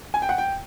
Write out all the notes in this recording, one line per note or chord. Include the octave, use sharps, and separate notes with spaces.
G#5
G5
F#5
G5